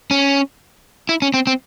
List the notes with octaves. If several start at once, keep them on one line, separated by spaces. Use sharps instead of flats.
C#4
E4
C#4
C4
C4